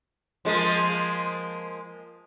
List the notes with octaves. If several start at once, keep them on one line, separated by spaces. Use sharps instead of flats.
F3 G#3 A#3